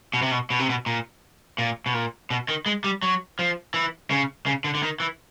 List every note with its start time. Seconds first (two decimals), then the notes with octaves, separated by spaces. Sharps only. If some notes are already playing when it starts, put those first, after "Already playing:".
0.14 B2
0.22 C3
0.31 B2
0.50 B2
0.59 C3
0.70 B2
0.86 A#2
1.58 A#2
1.86 B2
1.94 A#2
2.30 B2
2.48 D#3
2.66 G#3
2.84 G3
3.02 F#3
3.39 F3
3.74 E3
4.10 C#3
4.46 C#3
4.64 D3
4.75 D3
4.83 D#3
5.00 E3